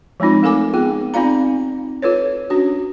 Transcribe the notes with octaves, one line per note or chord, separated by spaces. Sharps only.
F3 G#3 C4 D#4 F4
A3 A4 A#4 G#5 D6
B3 F4 G#4
C4 D#4 F4 D5 F5 A#5
F4 A4 B4 C#5
C#4 D4 F#4